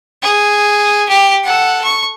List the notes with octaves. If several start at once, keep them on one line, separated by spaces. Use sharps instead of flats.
G#4
G4
A4 F#5
C#6